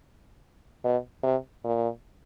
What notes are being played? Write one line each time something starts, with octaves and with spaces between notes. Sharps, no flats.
B2
C3
A#2